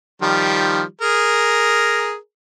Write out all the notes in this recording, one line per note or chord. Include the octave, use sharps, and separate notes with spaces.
D#3 F3 G3
G#4 A#4